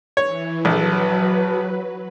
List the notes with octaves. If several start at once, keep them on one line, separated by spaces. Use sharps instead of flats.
E3 C#5
A#1 F#3 A4 B4